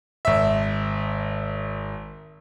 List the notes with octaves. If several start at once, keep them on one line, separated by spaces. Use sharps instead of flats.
G#1 E5